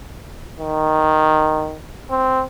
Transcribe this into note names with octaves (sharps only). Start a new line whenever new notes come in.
D#3
C4